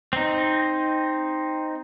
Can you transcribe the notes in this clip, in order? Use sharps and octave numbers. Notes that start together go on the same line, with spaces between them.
C4 D#4